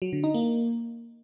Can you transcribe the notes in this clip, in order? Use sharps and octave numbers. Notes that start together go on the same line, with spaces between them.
F#3
D3
D#4
A#3